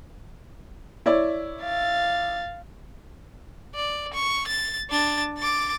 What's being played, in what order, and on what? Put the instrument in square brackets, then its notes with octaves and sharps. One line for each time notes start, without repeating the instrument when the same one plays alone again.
[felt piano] E4 C#5 D5
[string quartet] F5 A6
[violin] D5
C#6
A6
D4 A6
D6 A6